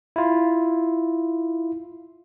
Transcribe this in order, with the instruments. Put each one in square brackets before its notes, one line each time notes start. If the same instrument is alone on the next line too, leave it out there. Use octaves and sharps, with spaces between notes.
[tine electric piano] E4 F4